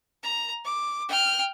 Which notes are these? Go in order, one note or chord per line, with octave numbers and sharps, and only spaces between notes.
A#5
D6
G5 F6